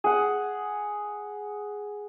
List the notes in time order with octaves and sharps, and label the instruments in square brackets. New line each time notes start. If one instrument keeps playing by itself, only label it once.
[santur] G#4 F#5